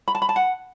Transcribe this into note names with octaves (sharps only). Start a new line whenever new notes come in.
B5
A5
B5
A5
F#5